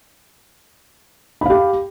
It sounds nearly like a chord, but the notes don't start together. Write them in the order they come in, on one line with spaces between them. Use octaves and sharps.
B5 F5 G4